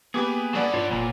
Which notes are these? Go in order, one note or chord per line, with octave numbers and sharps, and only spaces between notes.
A#3 B3 G4 G#4 B4 D6
F#3 A4 B4 D5 F#5
G2 F4 C5 C#5
F1 A#2